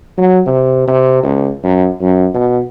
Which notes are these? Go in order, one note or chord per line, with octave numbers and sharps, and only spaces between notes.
F#3
C3
C3
C#2
F#2
F#2
B2